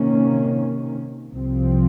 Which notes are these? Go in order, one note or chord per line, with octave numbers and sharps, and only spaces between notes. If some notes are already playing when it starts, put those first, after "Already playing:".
Already playing: C3 D#3 A#3 C#4
C2 C3 F3 C4